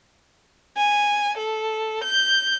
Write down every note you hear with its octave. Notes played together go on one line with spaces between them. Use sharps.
G#5
A4
G6